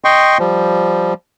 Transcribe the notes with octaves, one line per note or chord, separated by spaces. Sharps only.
D#5 G5 C6 C#6
F3 G3